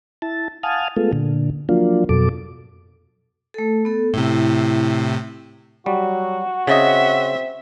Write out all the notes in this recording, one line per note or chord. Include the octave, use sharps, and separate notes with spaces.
E4 A5
F5 F#5 G#5 A5 D#6 F6
G#3 A3 B3 F4 A4
A#2 D3
F3 F#3 A#3 D4 F4
F2 B2 F#3 A4 D6
A3 A4
B3 A4
A2 C3 E4
F#3 G3 F#4
C#3 C4 D#5 E5